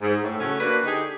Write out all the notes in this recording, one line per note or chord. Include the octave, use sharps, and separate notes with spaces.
G#2
A2
C#3 F#3 A3 C#4
A#3 D4 F#4 B4
D3 D#4 G4 G#4